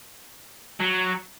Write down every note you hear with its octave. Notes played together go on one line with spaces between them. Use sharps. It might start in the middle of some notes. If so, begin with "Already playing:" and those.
F#3